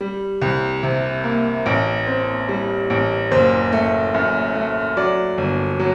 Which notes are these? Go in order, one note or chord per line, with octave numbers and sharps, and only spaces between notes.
G3
C2
C3
A#3
A1
C4
G3
A1
F#1 C5
A3
F#2
A3
F#3 D5
G1
F#3